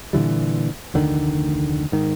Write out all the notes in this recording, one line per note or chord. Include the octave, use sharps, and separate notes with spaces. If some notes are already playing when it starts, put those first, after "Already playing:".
A#2 D3 E3 G3
F1 D2 D3 D#3
G#2 D#3